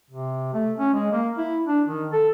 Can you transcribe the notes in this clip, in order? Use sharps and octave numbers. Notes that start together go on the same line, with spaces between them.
C3
A3
C#4
G#3
A#3
E4
D4
D#3
A4